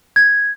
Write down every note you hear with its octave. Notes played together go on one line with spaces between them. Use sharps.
G#6